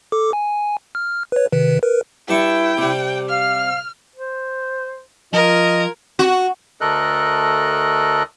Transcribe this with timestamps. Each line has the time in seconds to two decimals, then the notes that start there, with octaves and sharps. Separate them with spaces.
0.12 A4 D6
0.33 G#5
0.95 F6
1.32 B4 C#5
1.52 C3 D#3 B4
1.83 A#4 B4
2.28 G2 E4 G5 A5 C#6
2.77 C3 G3
3.30 F5 F6
4.16 C5
5.33 F3 F4 A#4 D#5 G#6
6.19 F#4
6.81 D2 A3 A4 A#4 D#5 F#6